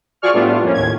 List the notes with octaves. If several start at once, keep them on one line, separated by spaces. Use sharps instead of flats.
F3 F#4 G#4 D5 C#6 F6
A2 G3 A3 B3 D4 F4
F2 A#3 C#4
D#2 A2 G#6